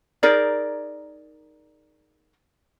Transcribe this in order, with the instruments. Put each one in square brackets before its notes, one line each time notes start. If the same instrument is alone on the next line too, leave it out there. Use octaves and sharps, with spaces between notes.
[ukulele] D#4 G#4 A#4 D5